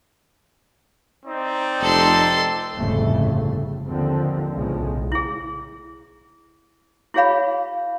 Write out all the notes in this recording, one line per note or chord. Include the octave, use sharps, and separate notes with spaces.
C4 D#4 D5
F1 A4 C6
G1 F2 A2 C#3 A3
D#2 D3 F3 C4
B1 A2 C#3 F3 G#3
E4 G#4
E4 F#4 G#4 C#5 F5 B5